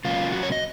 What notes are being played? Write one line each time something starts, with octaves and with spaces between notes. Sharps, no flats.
C#3 F#3 A#3 F4
F#4
C#5
D#5